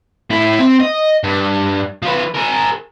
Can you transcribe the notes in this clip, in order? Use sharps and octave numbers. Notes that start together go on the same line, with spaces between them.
A2 E4
C4
D#5
G2
F3 B4
G#4 A#4